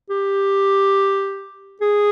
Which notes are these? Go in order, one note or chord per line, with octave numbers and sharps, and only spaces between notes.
G4
G#4